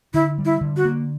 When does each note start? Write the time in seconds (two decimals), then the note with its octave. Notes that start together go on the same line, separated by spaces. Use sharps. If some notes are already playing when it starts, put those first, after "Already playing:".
0.14 D3 E4
0.38 G3
0.45 E4
0.61 D3
0.77 F#4
0.85 A#3